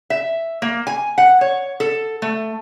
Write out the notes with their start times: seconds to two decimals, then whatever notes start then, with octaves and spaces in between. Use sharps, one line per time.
0.10 E5
0.62 A#3
0.87 G#5
1.18 F#5
1.41 C#5
1.80 A4
2.22 A3